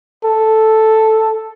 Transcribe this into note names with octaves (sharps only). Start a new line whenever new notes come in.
A4